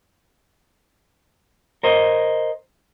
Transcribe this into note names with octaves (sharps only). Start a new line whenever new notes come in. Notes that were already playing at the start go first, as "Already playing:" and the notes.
A#4 C5 D#5